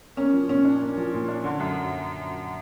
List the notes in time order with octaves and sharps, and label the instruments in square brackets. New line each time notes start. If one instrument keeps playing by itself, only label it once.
[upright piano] A#3 [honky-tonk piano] C#4
[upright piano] F3
[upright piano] A#2 [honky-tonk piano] C#4
[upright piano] D4
A#3
F3
A#2
D4
D3
F#2